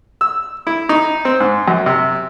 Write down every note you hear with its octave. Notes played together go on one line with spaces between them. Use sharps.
E6
E4
D#4
C4
G#2
F#2
C3